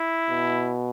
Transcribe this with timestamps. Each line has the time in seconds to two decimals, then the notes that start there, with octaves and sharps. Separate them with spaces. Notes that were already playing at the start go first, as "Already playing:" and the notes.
Already playing: E4
0.29 B2